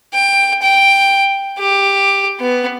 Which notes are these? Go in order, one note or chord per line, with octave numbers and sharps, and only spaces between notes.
G5
G5
G4
B3